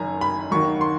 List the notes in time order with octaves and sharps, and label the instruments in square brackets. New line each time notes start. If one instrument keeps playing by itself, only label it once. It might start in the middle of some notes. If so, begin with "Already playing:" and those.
Already playing: [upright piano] F#1 F#2 D#3 G#5 A#5
B5
D#2 D#3 F#3 C#6
C6